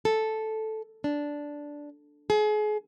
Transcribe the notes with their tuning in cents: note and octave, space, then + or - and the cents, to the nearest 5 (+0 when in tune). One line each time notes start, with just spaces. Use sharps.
A4 -5
D4 -5
G#4 +35